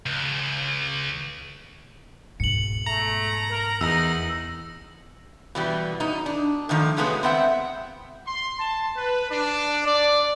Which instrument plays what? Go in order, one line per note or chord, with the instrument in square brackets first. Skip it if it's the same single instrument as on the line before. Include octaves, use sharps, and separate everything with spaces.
[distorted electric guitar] C#2
[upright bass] G#2 B2 [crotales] C#7 F#7
[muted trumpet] A3 [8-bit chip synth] A#5
[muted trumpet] A#4
[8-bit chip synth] E2 [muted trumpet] D#4 [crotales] E6 A#6
[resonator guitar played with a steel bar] B2 E3 G3
B2 D#4
D4
A2 D3 D#3 F3
C#3 F#3 G#3 A3 B3
B3 C4 E5 F#5
[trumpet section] C6
A5
B4
D4
D5